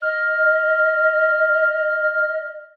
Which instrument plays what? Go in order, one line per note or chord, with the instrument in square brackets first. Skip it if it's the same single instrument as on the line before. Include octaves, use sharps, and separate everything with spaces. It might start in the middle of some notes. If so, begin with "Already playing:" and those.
[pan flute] D#5 [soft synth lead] F6